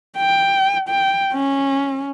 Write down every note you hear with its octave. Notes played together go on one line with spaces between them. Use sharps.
G5
G5
C#4